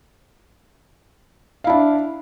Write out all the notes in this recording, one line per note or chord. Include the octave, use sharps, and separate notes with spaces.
D4 E4 F5